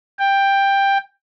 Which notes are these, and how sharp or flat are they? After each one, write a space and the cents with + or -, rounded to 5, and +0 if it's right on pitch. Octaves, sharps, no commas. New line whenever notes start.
G5 +10